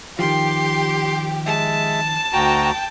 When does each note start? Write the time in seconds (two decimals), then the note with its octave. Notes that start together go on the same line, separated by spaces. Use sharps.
0.19 D#3 F3 G4 C6
1.46 G#3 E5 A5
2.33 D2 F#4 G5 A#5